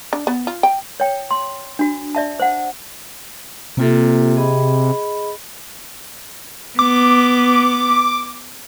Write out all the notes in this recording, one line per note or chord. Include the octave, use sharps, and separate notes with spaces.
D4
B3
F4
G5
C#5 G5
C6
D4 F#4
D5 E5 A5
C5 F#5
C3 A#3 F4 A4
G#4 D#5 B5
B3 D6